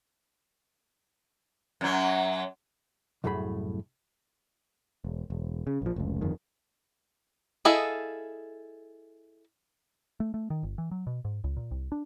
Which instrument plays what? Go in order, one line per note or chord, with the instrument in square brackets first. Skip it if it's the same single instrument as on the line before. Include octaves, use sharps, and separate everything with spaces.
[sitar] F#2 F#3
[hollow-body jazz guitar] C2 F#2 A2 A3 G#4 B5
[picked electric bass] E1
E1
C#3
A#1 F3
F1 C#2
G1 F2 D#3
[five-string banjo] E4 G#4 A4 D#5 F5
[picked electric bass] A3
A3
D#3
G1
E3
F#3
B2
G#2
C#2
A#2
C2
D4